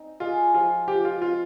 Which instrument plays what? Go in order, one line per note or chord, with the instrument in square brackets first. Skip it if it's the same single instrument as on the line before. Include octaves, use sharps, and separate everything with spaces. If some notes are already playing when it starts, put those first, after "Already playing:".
Already playing: [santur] C4 D#4
[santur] G#3 [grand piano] F4
[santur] F3 [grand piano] F4
[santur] F3 [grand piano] G4
[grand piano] F4
[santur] C4 [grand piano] F4